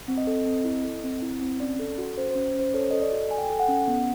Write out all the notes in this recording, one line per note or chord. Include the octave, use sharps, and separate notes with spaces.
C4
D#5
A4
C4
E4
A4
C4
E4
C4
C#4 D5
A4
F#4
C#4 C5
C#4 C5
C#4 C5
A4 C#5
A4 D#5
D5
F#4
A4 G#5
G5
A4 G#5
F#5
C#4
B3